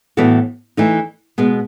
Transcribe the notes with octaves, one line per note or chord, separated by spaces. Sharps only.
A2 E3 B3 F#4 A4
E3 A3 D#4
B2 G#3 B3